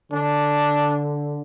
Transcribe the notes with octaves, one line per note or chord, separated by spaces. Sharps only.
D3 D4